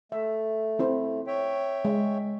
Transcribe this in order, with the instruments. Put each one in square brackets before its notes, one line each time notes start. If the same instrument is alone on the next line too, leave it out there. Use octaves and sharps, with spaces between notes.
[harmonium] A3 [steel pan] E5
[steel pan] C4 E4 C5
[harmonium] C#5 E5 G5
[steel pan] G#3